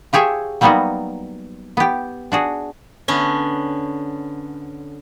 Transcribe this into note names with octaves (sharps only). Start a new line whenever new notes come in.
F4 G4 G#4 C#5 E5
F#3 G3 A#3 B3 D#4 F#4
B3 G4
D4 F#4 G#4
D3 B3 C#4